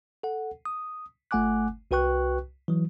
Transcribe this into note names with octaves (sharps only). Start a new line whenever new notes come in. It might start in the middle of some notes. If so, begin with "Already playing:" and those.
A4 F#5
D#6
G1 A3 F#5 G#5 D6 F#6
C2 F#4 B4 G5 C#6 F#6
E3 F#3